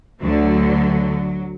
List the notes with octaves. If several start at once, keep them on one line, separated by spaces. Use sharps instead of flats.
D2 D3 F#3